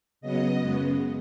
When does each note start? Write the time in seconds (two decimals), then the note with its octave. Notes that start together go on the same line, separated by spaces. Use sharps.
0.21 C#3 F#3 B3 D#5
0.59 F#2 C#3 G#3 B3